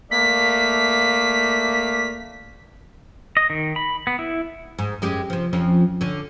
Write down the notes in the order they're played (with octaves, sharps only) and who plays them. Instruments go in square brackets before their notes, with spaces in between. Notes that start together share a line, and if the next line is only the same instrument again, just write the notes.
[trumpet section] A3 A#3 D5 [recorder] B6
[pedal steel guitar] D#5
D#3
B5
B3
E4
[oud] G#2
F#2 G#3 G4
C3 F3
F2 F3 C#4
D3 C#4